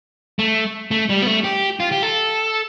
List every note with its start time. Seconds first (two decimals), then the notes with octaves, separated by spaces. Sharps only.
0.39 A3
0.91 A3
1.09 G3
1.22 B3
1.26 A3
1.44 G4
1.80 F4
1.92 G4
2.03 A4